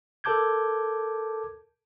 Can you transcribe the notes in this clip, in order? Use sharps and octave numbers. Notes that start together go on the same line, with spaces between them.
A4 A#4 A5 D6 G6 G#6